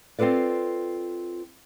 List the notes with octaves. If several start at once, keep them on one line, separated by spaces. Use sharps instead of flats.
C4 F4 A4 B4 D5